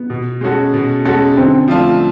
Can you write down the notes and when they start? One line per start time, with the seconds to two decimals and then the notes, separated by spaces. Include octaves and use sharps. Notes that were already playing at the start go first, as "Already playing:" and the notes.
Already playing: B3
0.10 B2
0.41 G#3 C#4 F#4 A4
0.74 B2
1.05 G#3 C#4 F#4 A4
1.37 D3 C4
1.68 F3 A3 D4 F4